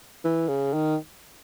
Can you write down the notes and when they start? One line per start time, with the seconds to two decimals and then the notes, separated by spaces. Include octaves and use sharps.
0.24 E3
0.48 C#3
0.74 D#3